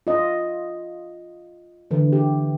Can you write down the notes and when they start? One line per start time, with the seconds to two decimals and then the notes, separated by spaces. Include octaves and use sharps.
0.07 F4 D#5
1.91 D3 E3
2.13 G4